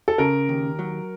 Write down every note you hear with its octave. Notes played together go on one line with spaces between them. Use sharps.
A4
C#3 A#4
D#2
F#3